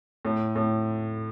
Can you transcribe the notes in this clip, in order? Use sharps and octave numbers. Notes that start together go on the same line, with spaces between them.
A2
A2